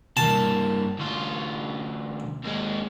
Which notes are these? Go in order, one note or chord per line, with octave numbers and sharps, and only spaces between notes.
G2 A#3 A5
D2 F4
D#2 G#3